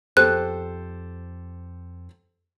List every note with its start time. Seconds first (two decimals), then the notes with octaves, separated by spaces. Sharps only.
0.17 F2 G4 A4 C5 F#6